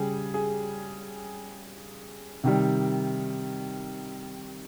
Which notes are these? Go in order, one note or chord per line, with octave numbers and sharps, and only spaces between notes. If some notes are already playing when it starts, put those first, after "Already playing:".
Already playing: C#3 G3 G4 G#4
G#4
C3 D#3 G3